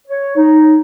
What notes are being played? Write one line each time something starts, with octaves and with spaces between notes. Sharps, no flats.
C#5
D#4